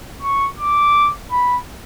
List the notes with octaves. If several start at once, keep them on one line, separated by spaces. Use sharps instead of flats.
C#6
D6
B5